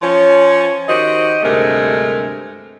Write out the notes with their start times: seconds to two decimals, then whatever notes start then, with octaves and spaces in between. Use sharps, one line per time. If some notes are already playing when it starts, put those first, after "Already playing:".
0.02 F3 C#4 C#5
0.88 D#3 F#4 G4 C5 D#5
1.43 D2 G2 C3 G#3 A3 A#4